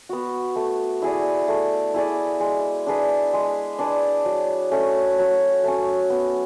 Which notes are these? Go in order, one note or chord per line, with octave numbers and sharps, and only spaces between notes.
B3 F#4
A3
E4 G#4 D5
A3
E4 G#4 D5
G#3
D4 G#4 B4
G#3
D4 G#4 B4
F#3
A3 C#4
F#3
A3 C#4
B3